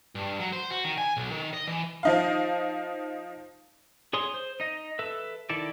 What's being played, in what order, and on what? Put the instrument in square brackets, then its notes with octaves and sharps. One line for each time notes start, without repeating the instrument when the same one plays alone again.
[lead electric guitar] G2
F#3
C5
F#4
D#3
G#5
B1
D#3
D#5
E3
[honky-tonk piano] F3 D#4 F5
[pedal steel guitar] G#4 C#5 C6 D#6
C5
D#4 D#5
A4 B4 E5
D#3 E4 A4 D5